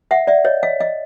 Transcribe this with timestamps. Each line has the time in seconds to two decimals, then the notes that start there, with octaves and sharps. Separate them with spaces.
0.11 E5 F#5
0.27 D5 E5
0.45 C#5 D#5
0.63 D#5 F5
0.80 D#5 F5